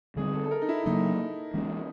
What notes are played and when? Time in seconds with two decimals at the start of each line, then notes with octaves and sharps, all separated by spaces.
0.16 D3 G3 C4 G#4
0.34 A4
0.44 A4
0.51 A#4
0.62 D#4
0.69 E4
0.86 C#3 F#3 A#3 D4 D#4
1.54 E3 G#3 C#4